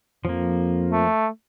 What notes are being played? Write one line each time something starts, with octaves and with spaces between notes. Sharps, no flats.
F2 F3 A#3
A3